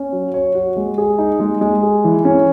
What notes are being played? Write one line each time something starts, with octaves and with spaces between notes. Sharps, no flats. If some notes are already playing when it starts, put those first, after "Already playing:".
Already playing: C#4
F#3
C#5
F#4
G#3
G#4
D#4
G#3
G#3
G#4
E3
C#4